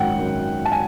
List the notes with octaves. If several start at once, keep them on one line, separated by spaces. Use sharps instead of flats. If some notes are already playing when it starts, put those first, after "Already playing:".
Already playing: G#1 F#2 D#3 F#5 G5
G#1 F#2 D#3
A5
G#5